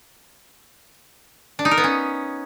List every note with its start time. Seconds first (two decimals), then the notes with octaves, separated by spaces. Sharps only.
1.59 D4
1.65 D#4
1.71 A#4
1.78 B3
1.84 C#4